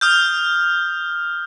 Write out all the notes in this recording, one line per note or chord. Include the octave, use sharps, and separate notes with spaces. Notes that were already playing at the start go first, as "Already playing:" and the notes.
D#6 F6 G6